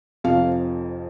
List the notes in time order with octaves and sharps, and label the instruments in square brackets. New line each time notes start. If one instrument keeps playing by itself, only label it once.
[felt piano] F1 F2 F3 F5